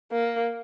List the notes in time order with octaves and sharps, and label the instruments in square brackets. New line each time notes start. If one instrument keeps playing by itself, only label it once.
[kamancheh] A#3